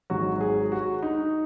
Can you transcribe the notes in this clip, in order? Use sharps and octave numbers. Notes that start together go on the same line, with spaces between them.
G#1 G#2 F#3 F#4
G#4
F#4
D#4